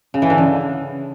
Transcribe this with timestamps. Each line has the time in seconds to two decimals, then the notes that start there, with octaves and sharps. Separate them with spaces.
0.14 C#3
0.22 E3
0.30 D3
0.38 C#3